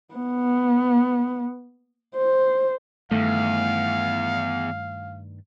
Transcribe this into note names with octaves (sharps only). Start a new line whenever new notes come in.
B3
C5
E2 G2 D#3 A3 F5